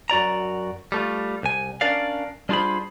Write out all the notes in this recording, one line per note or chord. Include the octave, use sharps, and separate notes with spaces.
F#2 F#4 D5 A#5
G3 A3 F4
C2 G#5
C#4 D4 A#4 D5 F5
G3 D4 F4 G#4 C5 B5